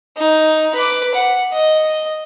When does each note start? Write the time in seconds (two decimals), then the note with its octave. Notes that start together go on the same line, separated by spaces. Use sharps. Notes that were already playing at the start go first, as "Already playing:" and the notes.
0.17 D#4
0.75 B4 D6
1.14 F#5
1.52 D#5